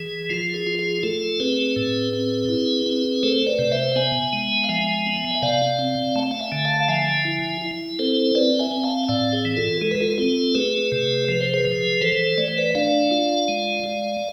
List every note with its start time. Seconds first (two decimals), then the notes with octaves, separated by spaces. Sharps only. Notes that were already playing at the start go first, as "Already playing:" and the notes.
Already playing: E3 G#4
0.30 F3 F4
0.54 G#4
0.67 F4
0.79 G#4
1.03 A3 F4 A4
1.40 C4 G#4 B4
1.76 A2
2.13 C4
2.49 E4
2.86 C4
3.23 A3 A4 C5
3.47 B4 D5
3.59 C3
3.71 C5 E5
3.96 B3 E5 G#5
4.33 G#3
4.64 F5
4.69 F3 E5 G#5
5.06 B3
5.35 E5
5.43 C3 D5 F5
5.79 C4
6.15 A3 A5
6.31 F5 A5
6.39 E5 G#5
6.52 D3
6.65 F5 A5
6.81 F5
6.88 F3 E5 G#5
7.25 E4
7.61 E4
7.99 C4 A4 C5
8.35 C4 B4 D5
8.59 E5 G#5
8.71 C4
8.84 F5 A5
9.03 G#5
9.09 A2 D5 F5
9.33 G#4
9.45 E3
9.57 F4 A4
9.81 G#3 A4
9.91 B4
10.00 F4 A4
10.18 C4 F4 A4
10.55 A3 G#4 B4
10.92 C3
11.28 F3 B4
11.41 C5
11.54 G#4 B4
11.65 F3
12.01 E3 A4 C5
12.38 A3 D5
12.48 C5
12.58 B4 D5
12.75 D4 D5 F5
13.11 F4
13.48 G#3
13.84 G#3